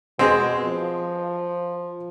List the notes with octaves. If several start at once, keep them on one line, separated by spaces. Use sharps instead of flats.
B2 G#3 C4
F3